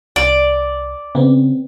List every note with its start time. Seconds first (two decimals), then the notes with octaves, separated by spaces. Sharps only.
0.16 C2 D5
1.15 C#3 B3 C4